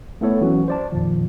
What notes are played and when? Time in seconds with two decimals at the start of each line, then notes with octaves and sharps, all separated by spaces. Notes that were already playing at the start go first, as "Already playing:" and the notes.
0.21 A3 B3 E4 A4 C#5
0.41 E3 F#3 C#4 F#4
0.68 C5 D5 A5
0.92 F2 A#2 D#3 F3